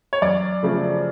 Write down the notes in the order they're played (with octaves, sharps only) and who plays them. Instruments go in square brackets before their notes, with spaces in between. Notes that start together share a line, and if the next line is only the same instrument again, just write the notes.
[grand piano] C#5
F#2 D5
C#3 F3 A3